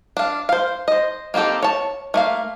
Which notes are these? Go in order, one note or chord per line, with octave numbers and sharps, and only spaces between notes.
D4 F5
C5 F5
C5 D#5
A#3 C4 D#4 G4 A4
C#5 A5
A3 A#3 F5